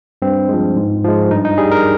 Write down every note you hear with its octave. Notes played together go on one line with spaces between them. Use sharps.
G2 C4
F3 G#3
G#2
F3 G#3
G2 D#4
D#4
G3 G#4
A#4